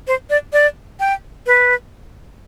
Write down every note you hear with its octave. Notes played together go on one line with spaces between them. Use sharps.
C5
D5
D5
G5
B4